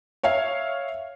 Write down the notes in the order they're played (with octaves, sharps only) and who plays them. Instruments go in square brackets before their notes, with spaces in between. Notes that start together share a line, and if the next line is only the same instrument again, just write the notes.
[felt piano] C#5 E5 F5